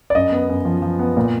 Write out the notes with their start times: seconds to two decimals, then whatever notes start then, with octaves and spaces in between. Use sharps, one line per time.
0.10 D5
0.15 F#2 D#5
0.32 B3
0.49 F#2
0.65 F3
0.82 F3
0.99 B3
1.17 A#2